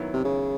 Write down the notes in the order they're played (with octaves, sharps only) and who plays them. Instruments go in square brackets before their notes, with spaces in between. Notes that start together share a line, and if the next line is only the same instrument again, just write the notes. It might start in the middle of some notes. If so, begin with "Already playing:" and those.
Already playing: [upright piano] D#3 F#3 B3 E4
[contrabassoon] C3
C#3